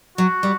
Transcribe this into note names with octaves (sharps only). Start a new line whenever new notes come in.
F#3 F#4
G3